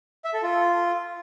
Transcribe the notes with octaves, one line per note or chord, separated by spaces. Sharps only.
E5
A4
F4